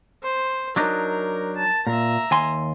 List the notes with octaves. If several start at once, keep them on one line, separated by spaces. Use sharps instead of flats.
C5
F#3 D4 D#4 A#4
A5
A#2 E5 A#5
D#2 G#5 C6